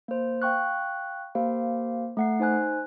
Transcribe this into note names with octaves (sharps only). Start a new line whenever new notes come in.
A#3 C5
F5 G5 C#6 F#6
A#3 G4 C5 F5
A3 F#5 C7
D#4 C5 G#5 F#6